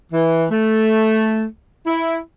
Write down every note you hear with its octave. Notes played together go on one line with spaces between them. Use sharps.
E3
A3
E4